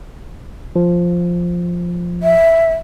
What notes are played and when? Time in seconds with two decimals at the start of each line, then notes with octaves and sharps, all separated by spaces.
0.76 F3
2.23 E5